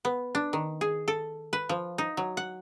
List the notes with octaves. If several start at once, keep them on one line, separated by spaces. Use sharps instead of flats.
B3
D4
D#3
G#4
A4
B4
F3
D#4
F#3
F#5